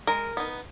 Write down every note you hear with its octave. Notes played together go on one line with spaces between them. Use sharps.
G#3 A#4
B3 D#4